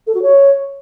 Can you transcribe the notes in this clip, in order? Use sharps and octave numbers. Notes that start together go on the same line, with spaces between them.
A4
F#4
C#5